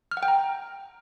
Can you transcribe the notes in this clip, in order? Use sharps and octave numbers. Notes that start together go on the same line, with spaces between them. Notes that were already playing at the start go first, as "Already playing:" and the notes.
F6
F#5
G5
A#5